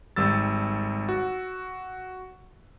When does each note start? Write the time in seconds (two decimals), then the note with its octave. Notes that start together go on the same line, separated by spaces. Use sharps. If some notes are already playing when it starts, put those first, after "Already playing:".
0.16 G#1 G3 E6 A6
1.09 F#4